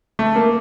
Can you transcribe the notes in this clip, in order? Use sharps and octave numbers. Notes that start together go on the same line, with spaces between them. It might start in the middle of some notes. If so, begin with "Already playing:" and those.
A3
A#3